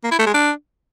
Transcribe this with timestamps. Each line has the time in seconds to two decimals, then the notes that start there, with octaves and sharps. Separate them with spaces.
0.04 A#3
0.11 E4
0.19 A3
0.26 G#3
0.34 D4